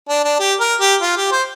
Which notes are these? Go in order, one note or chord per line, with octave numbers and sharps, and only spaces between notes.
D4
D4
G4
A#4
G4
F4
G4
C5